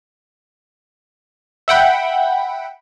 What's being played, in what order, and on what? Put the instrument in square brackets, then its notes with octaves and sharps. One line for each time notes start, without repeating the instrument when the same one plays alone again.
[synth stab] E5 F#5 G5 B5